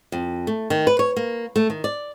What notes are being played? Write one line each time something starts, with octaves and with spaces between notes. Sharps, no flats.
F2
A3
D#3
B4
C#5
A#3
A3
D#3
D5